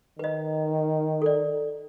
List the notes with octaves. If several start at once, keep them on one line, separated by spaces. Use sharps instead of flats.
D#3 B4 D#5
A4 D5